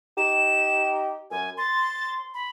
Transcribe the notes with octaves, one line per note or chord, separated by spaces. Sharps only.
D#4 G4 E7
F#2 G#5
C6 A6
B5